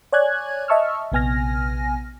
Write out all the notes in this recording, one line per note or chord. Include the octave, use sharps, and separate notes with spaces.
C#5 D5 G#5 F#6 G#6
D#5 E5 A5 C#6 E6 F6
A#1 C3 B3 G#5 F6 A#6